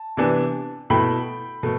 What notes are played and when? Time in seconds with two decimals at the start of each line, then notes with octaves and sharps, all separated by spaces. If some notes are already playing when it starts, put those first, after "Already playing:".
Already playing: A5
0.17 C3 E3 B3 D4
0.90 B2 A3 E4 G5 B5
1.63 B2 A3